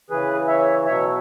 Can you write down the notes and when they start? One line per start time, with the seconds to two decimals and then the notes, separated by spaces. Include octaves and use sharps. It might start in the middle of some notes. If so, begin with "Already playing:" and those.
0.10 C#3 E3 G#4 B4
0.48 C#5 E5
0.86 B2 F#3 C#5 E5